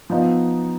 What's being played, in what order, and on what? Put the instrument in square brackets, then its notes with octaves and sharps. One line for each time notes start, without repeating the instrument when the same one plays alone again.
[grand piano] F3 B3 D#4